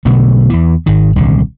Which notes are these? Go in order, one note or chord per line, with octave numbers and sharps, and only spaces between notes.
B1 B2 D3 A3
E2 E3
G#1 D#3
D#1 C2 D3